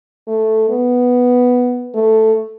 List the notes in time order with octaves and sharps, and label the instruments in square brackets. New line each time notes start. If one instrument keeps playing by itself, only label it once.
[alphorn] A3
B3
A3